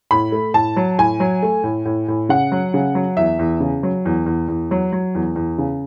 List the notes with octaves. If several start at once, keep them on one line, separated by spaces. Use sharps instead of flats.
A2 B5
A3
A2 A5
F#3
A2 G#5
F#3
A3
A2
A2
A2
C#3 F#5
F#3
C#3
F#3
E2 E5
E2
C#3
F#3
E2
E2
E2
F#3
F#3
E2
E2
C#3